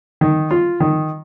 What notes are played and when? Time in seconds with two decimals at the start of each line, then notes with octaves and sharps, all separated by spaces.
0.21 D#3
0.51 F4
0.80 D#3